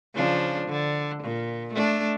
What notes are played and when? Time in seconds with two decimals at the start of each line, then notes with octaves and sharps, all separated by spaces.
0.14 C#3 F3 D4
0.68 D3
1.23 A#2
1.74 A3 D4